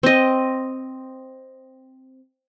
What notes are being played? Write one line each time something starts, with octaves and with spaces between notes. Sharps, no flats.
C4 D#5